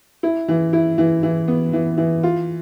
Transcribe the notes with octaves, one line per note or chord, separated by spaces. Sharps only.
E4
E3
E4
E3
E3
B3
E3
E3
F4